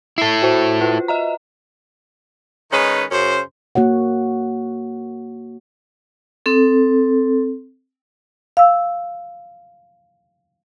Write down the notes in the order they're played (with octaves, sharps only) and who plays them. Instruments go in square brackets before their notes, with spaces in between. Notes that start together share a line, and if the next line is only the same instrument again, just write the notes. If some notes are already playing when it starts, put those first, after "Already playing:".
[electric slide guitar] E4 A4 [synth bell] C7
[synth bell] F#4 C5
F4 B4
D#5 E5 A#5
[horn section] D#3 G#3 C#4 D#4 B4
F#2 C#3 C#4 C5
[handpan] A#3 F#4 C#5 F#5
[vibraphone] C4 A4
[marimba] F5 E6